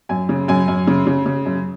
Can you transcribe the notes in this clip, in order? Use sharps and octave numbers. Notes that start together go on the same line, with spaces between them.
F#2 G#5
C#3
F#2 G#5
F#2
C#3
C#3
C#3
F#2